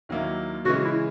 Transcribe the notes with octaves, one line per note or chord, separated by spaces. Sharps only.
D#2 D#3 F#3 A#3 E4
C#3 E3 G#3 F#4
E4